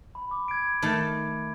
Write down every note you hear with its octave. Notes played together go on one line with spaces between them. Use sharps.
B5
D6
G#6 D7
D#3 A3 A5